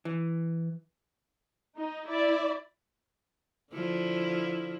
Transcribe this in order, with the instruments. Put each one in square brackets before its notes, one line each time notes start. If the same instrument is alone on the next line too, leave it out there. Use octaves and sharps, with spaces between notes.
[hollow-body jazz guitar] E3
[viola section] D#4
E4 D5
[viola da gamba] D3 F3 E4